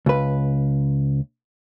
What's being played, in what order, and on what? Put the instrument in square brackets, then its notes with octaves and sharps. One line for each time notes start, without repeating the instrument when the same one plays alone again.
[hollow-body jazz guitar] C#2 B4